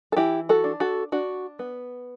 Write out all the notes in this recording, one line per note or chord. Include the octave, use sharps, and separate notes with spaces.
A4
E3 E4 G4
F#4 A4
D4
F#4 A4
D4 F#4
B3